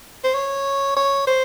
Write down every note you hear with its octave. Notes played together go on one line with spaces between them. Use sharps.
C5
C#5
C#5
C5